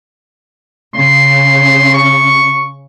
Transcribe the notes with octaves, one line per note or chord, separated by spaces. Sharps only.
C#3 C6
C#6